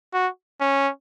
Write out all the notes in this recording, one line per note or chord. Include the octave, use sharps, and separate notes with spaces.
F#4
C#4